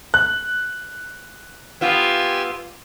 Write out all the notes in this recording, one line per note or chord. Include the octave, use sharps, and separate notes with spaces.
F#6
B3 F4 G4 G#5 E6